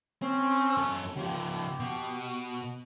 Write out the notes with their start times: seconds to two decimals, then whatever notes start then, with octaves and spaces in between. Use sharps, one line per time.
0.22 C4 C#4
0.77 F#2 A4
1.17 C#3 F3 G4
1.80 B2